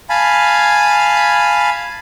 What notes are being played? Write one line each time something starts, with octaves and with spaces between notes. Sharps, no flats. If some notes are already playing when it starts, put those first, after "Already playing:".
F5 G#5 A5 B5